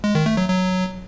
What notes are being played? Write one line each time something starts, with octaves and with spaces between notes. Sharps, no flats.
G#3
D#3
A3
F#3
F#3